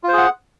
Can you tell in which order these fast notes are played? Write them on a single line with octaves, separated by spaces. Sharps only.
F4 C5 G#4 F#5